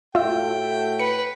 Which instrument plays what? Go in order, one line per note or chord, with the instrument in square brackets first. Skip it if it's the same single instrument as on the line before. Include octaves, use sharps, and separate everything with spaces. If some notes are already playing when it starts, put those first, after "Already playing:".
[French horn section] A2 A3 F#4 [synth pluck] F4 E5 [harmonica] G5
[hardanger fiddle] B4 [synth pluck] C#7